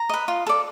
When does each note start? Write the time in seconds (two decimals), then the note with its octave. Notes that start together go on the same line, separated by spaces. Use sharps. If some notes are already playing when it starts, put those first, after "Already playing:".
Already playing: A#5
0.09 B4 D#5
0.28 F4
0.46 A4 D5